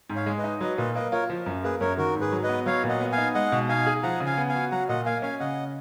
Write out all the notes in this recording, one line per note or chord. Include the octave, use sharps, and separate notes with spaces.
G#2
C#5 F5
G#3
B4 D#5
D#4
F#3 B4 D#5
A#2 B4 D#5
A#3 B4 D#5
F4 A#4 C#5
F3
F#2
A#3 G#4 B4
F#2 A#4 C#5
D#3 F#4 A#4
G#2
G#4 B4
F#3
B4 D#5
B3
F#3 C#5 F5
A#2
D#5 F#5
B3
F5 G#5
D#4
G#3 D#5 F#5
B2
D#4 F5 G#5
G#4
F3 F#5 A#5
C#3
F5 G#5
B3
F5 G#5
F#4
F#3 F#5 A#5
A#2 D#5 F#5
A#3 F5 G#5
C#4 F5 G#5
C#3 D#5 F#5